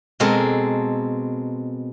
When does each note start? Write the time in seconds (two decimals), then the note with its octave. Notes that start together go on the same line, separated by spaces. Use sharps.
0.20 B2 G#3 C4 A4 A#4